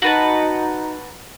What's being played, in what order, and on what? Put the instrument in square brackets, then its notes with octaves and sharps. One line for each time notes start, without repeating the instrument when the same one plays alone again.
[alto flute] D#4 [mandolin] F#4 B4 A5